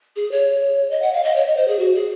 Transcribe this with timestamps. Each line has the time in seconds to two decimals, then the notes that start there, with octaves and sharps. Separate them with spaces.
0.16 G#4
0.31 C#5
0.91 D#5
1.02 F#5
1.13 F5
1.24 D#5
1.36 C#5
1.46 D#5
1.57 C5
1.68 G#4
1.79 F#4
1.95 G#4